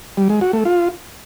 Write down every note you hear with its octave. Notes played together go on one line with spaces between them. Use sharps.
G3
G#3
F#4
A3
F4